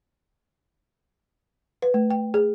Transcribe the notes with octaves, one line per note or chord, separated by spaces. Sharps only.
B4
A3
G5
G#4